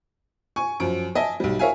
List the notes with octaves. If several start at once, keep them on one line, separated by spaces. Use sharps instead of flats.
G#5 C#6
F#2 F3 D7
D#5 E5 G#5 A5
B1 G3
A#4 C#5 E5 F5 G#5